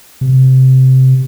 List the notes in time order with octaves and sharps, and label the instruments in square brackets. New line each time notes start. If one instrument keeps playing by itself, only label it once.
[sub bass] C3